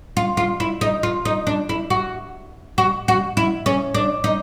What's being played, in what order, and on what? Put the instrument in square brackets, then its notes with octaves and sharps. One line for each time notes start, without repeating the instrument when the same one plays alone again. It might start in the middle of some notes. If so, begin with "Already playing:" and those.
[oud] F4
F4
E4
D#4
F4
D#4
D4
E4
F#4
F#4
F#4
E4
C#4
D4
D#4